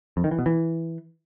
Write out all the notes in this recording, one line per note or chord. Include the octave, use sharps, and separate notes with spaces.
F2
D#3
E3
B2
E3